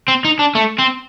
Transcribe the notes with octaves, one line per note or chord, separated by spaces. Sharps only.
C4
D#4
D4
A3
C4